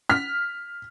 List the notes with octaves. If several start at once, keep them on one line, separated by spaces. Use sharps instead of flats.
F6 B6